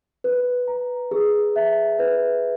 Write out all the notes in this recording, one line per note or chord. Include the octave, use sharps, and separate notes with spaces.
B4
A#5
G#4
E5
B4